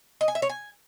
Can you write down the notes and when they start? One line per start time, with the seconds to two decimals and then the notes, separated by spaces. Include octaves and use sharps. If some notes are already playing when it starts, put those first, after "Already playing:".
0.21 D#5
0.28 G#5
0.35 E5
0.42 C#5
0.50 G#5